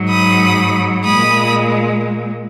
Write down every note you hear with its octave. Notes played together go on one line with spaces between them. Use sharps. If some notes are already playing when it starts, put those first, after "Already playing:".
Already playing: G#2 F#3
B5 D#6
A#2 G#3 B5 D#6